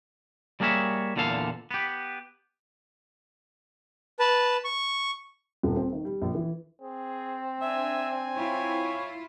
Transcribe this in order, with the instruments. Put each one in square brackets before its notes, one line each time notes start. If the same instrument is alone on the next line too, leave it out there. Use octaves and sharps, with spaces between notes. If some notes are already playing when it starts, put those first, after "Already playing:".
[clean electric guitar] G3 A#3 G#4 A#4 C#5 E5
E2 A#2 D3 A4 F5
B3 G4
[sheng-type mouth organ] B4 A5
C#6
[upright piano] D#1
C4
D#3
G3
A#1
E3
[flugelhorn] C4 [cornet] G#4
[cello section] D4 [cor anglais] E5 [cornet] G#5
[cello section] E4 F4 [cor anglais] C#5